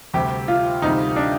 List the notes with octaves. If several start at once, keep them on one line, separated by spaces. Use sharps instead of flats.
D2 C3 G3 G4
F4
D2 C3 G3 D#4
D4